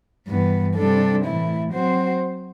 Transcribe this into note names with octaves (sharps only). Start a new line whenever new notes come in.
G2 E3 B3
C3 G3 D4 A4
A2 E3 A3 E4
F#3 C4 F#4 C5